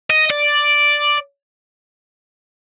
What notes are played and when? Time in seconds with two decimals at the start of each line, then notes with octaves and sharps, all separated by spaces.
0.10 D#5
0.30 D5